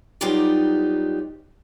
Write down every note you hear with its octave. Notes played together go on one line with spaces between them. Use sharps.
F#3 G3 B3 D#4 F4 G4